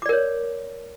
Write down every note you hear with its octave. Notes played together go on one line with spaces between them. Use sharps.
A#4 C#5 D5 D6